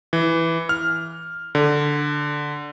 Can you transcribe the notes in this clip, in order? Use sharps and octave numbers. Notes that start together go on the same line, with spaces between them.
E3
F6
D3